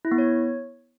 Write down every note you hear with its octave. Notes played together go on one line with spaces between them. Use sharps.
E4
B3
C#5